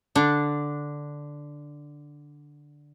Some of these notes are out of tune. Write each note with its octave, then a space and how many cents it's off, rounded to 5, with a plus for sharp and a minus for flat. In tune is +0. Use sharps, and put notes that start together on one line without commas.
D3 +0 D4 +0